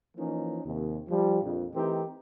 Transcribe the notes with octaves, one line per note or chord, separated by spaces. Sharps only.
E3 F3 A#3 C#4 D#4
D#2 C3
F3 G3
A#1 F2
E3 A3 C4 D#4 G4 A#4